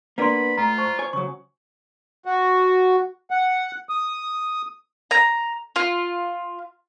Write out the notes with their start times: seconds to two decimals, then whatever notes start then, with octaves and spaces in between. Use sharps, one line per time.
0.18 A#3 B3 D4 B4 D5 B5 C6
0.57 A2 F4 A#5
0.78 C5 A5 C#6
0.99 C#5 G#5
1.13 C#3 F#3 C#6 D#6
2.25 F#4
3.30 F#5
3.89 D#6
5.11 A#5
5.76 F4